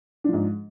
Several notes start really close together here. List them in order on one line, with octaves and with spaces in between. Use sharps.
D4 F3 G#2